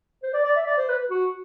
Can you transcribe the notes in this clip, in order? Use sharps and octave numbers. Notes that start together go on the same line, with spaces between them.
C5
D5
D5
E5
D5
C5
B4
F#4